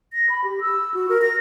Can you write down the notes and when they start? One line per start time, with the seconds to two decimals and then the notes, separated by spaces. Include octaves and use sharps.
0.13 A#6
0.29 B5
0.44 G4
0.61 E6
0.94 F#4
1.09 A#4
1.22 A#6